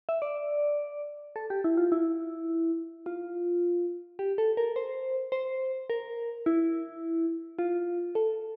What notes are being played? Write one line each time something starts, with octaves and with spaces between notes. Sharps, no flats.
E5
D5
A4
G4
E4
F4
E4
F4
G4
A4
A#4
C5
C5
A#4
E4
F4
A4